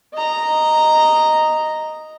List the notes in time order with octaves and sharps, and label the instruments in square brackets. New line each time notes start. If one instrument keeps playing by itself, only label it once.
[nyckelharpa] D#5 A#5